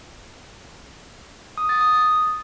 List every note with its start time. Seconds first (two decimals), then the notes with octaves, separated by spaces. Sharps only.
1.58 D#6
1.69 A6
1.81 D#6